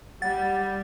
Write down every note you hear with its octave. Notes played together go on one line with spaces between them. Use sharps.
G3 F#5 A6